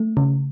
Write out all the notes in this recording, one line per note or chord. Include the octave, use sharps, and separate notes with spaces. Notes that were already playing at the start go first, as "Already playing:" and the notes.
Already playing: A3
C#3